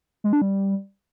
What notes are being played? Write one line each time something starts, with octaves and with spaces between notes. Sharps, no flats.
G#3
D4
G3